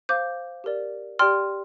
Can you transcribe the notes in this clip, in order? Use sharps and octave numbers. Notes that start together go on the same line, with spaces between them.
C5 F5 D6 G6
G4 A#4 D5
G4 D5 G5 C6 F6